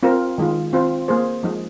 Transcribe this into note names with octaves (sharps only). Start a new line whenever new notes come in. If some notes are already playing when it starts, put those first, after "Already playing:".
C4 F4 A#4
D#3 G#3 F4
C4 F4 C5
A#3 G#4 C5
F3 G#3 D#4